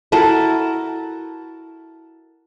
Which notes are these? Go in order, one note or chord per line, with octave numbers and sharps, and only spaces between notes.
E4 F#4 A4 A#4